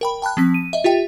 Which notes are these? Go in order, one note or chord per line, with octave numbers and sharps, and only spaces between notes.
A#4 G5 B5
G5 A5 B5 F#6
F3 C4 B6
D#7
D#5 E5
F4 G4 E5 G5